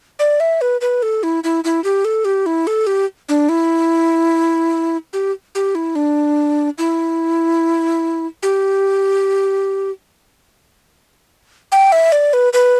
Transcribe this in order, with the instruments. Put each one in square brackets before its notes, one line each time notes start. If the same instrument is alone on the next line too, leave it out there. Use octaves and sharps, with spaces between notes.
[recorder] D5
E5
B4
B4
A4
E4
E4
E4
G4
A4
G4
E4
A4
G4
D4
E4
G4
G4
E4
D4
E4
G4
G5
E5
D5
B4
B4